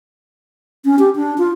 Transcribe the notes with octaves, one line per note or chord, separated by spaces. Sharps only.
C#4
G4
D4
F4